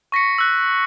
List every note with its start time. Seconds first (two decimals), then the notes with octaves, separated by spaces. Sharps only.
0.12 C#6 A#6 B6 C#7
0.38 E6 F#6